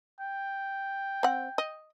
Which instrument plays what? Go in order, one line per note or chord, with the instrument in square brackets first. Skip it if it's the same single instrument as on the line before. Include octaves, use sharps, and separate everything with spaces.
[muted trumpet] G5
[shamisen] C4 F#5
D#5